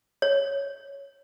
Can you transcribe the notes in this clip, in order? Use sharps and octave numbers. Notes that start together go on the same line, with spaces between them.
C#5